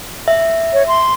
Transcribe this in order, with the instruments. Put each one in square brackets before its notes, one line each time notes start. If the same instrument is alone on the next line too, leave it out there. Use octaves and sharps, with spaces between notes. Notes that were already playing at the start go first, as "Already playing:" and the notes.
[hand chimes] E5
[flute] C#5
C6